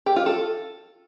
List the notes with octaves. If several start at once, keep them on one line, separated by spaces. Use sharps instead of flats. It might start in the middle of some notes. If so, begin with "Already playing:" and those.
G4
F4
A4